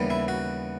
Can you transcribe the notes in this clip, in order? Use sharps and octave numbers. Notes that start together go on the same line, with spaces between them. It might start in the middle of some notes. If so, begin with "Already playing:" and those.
Already playing: D#2 C#3 E3 G3 B3
E4
F#4